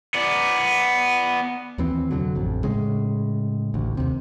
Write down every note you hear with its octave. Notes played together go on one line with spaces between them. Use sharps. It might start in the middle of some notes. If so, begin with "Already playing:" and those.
B3 D5
D#2 E3 C4
F1 D3 F#3
A1 F2
A2 C#3 G#3
A1 D2
D#2 C3